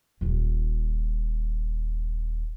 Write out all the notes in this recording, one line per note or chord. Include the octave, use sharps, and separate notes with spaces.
D#1 F4